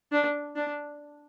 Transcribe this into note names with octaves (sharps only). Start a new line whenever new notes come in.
D4
D4